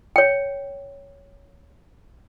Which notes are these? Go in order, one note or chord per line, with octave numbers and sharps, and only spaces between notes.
C#5 G5